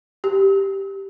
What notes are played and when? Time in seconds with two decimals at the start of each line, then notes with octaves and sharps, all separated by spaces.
0.24 G4